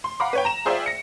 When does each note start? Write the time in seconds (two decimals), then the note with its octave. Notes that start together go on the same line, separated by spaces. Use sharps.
0.04 C6
0.20 F5 F#5 A#5 B5 D6
0.33 B4 C#5 G5
0.45 A#5 E7
0.65 F4 G#4 C5 D5 E5 G5
0.86 A#6 C#7